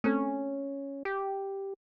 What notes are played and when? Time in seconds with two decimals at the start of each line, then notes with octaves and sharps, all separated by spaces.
0.04 A3 C4 C#4 A4
1.05 G4